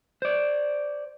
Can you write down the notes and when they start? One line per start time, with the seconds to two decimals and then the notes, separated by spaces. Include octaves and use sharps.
0.22 C5 D5